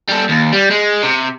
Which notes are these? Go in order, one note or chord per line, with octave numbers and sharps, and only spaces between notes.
G3 A4
D#2
G3
G#3
C3